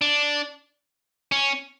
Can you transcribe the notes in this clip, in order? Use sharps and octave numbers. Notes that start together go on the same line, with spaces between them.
D4
C#4